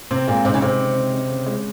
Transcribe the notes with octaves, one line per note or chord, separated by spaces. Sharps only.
C3 C4
A#2 G#3
C3 D#4
C#3
C3 C4
C#3
C#3
C#3
C#3
G#3